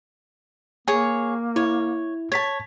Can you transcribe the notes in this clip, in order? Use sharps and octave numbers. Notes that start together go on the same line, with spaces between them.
A#3 G#4 C#5
E4 C#5
C#5 A5 G#6 B6